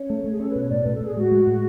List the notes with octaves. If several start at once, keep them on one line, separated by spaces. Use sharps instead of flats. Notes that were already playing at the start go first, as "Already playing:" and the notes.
Already playing: C#4 C#5
A3
A3
G#4
C#4 A4
B4
B2 C#5
A2 D5
A2 B4
A4
A2 G#4
G#3 F#4
G#3
A2